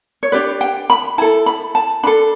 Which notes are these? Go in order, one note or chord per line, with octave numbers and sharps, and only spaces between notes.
C#5
D4 G4 B4 D5
G5
B5
E4 A4 A5
B5
A5
D4 A4 B5